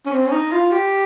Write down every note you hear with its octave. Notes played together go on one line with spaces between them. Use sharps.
C#4
C4
C#4
D#4
F4
G4